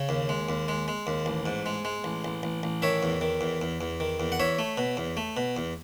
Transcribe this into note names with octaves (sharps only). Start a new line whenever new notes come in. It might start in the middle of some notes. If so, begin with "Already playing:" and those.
Already playing: C#3 C#5
D#2
G#3
D#2
G#3
G#3
D#2
A1
G#2
G#3
G#3
A1
A1
A1
A1
D#3 C#5 E5
E2
D#3
E2
E2
E2
D#3
E2
F#5
E2 C#5 E5
A3
B2
E2
A3
B2
E2